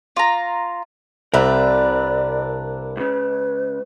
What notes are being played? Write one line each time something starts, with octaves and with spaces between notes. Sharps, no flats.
F4 A#5
C2 C4 D4 A#4 B4 D5 E5
C#2 C#3 B4